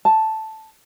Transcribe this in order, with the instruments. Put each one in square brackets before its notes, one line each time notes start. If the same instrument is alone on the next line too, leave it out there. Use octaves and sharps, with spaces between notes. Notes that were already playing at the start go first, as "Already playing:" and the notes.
[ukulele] A5